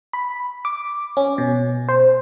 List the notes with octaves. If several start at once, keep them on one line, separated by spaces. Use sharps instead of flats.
B5
D6
C#4
B2
C5